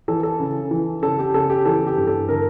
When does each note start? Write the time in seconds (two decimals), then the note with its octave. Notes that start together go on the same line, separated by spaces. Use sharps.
0.08 E3 A4
0.23 A4
0.40 C#3
0.71 E3
1.02 C#3 A4
1.19 G4
1.34 C#3 A4
1.50 G4
1.65 E3 A4
1.86 G4
1.97 G2
2.07 A4
2.29 D3 A#4